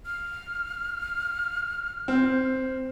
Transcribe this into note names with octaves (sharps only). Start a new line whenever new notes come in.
F6
C4